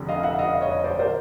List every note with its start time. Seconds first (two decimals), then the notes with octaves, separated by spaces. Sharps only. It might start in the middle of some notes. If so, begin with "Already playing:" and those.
Already playing: F1 F2 D3
0.09 D#5 F5
0.23 E5 F#5
0.39 D#5 F5
0.61 C#5 D#5
0.84 C5 D5
0.99 A#4 C5